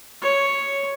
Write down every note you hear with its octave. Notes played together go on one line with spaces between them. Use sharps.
C#5